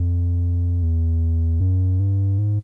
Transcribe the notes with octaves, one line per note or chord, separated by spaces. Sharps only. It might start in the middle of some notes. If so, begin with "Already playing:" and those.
Already playing: F2
E2
F#2
G2
G#2